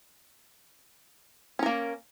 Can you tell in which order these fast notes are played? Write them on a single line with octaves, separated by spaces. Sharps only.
C#4 A#4 A#3